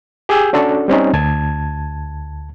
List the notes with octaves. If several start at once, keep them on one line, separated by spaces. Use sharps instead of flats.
G4 G#4 G5 G#5 E6 G6
C#4 D4 F#4 A4
G3 C4 C#4 D#4
D2 A5 G#6